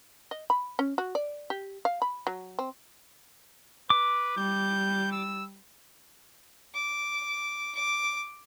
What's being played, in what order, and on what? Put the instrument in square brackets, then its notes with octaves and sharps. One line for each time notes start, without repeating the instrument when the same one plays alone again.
[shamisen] D#5
B5
C#4
F#4
D5
G4
F5
B5
F#3
C4
[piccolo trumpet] B4 [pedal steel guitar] D6
[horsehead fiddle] G3 [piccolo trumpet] G6
[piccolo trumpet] E6
[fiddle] D6
D6